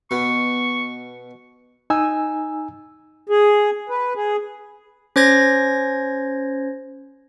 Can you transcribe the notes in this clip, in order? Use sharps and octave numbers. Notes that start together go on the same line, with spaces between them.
B2 C#6
D#4 G#5 E6
G#4
B4
G#4
C#4 C5 G#6 A#6